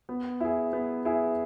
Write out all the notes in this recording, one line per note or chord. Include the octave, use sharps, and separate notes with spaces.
B3
E4 G#4
B3
E4 G#4